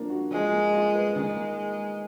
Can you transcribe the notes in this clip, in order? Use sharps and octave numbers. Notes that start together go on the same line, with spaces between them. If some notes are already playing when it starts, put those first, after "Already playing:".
Already playing: F3 A#3 D4
F#4
F3 G#3
A#3
F4
B4
D#3 G#3
A#3